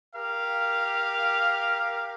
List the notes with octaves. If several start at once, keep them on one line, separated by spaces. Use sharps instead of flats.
G4 A#4 F5